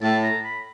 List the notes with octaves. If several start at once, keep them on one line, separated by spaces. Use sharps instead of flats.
A2 A5
A#5
B5